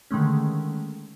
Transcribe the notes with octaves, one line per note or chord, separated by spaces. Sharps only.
D3 D#3 G#3 A3 C#4